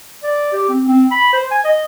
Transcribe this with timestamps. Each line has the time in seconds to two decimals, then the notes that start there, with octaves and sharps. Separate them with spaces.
0.23 D5
0.53 G4
0.69 C4
0.88 C4
1.11 B5
1.33 C5
1.51 G#5
1.65 D#5